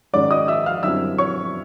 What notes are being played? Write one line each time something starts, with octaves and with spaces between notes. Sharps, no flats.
G#2 D#3 G#3 C#4 D5 D6
D#5 D#6
E5 E6
F5 F6
F#2 D3 G3 C4 E4 E5 E6
C#5 C#6